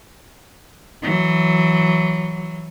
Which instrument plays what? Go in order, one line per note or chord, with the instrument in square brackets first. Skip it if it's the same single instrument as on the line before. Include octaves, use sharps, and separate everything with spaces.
[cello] E3 F#3